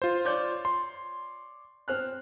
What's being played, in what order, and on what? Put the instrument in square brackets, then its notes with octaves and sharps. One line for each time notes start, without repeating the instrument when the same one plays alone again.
[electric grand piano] F4 C5
[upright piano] C#5 D5 G6
[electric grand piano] C6
[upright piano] C4 F6 F#6